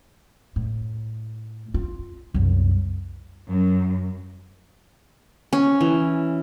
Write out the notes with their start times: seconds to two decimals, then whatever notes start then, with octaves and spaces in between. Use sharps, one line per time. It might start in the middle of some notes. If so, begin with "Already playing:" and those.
0.56 A2
1.74 F4
2.34 C2 F#2
3.50 F#2
5.53 C#4
5.81 E3